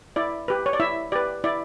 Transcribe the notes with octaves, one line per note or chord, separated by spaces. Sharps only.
E4 D5
G4 B4
C#5
D5
E4 E5
G4 B4 D5
E4 D5